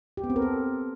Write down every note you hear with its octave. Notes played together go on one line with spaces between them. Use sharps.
G4
B3
C4
A#4
A4